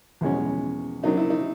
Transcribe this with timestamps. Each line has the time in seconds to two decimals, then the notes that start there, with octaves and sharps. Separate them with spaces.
0.21 E2 B2 G#3 C#4
1.03 C#3 F#3 A#3 D4 D#4
1.17 E4
1.30 D#4